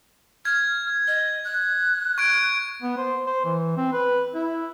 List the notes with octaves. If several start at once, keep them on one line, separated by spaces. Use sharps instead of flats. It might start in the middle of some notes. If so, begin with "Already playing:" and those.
F6 G#6
D#5
F#6
C#6 G#6 D7
B3
C5
C5
E3
C4
B4
E4